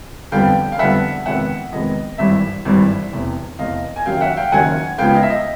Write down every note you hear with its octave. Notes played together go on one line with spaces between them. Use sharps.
F2 D3 G3 B3 F5 G5
F5
F2 D3 G3 B3 E5 F#5
F2 C3 D#3 G#3 B3 E5 F#5
F2 C3 D#3 G#3 B3 D#5
G#1 G2 E3 G3 E5
G#1 G2 E3 G3
F1 E2 C3
F1 E2 C3 D#5 F5
G#5
F#1 F#2 D#3 F#3 A#3 F5 G5
F5
E5 F#5
F5 G5
F#1 F#2 D#3 F#3 A#3 F#5 G#5
C#2 C#3 F3 G#3 B3 F5 G5
D#5 F5
E5
D#5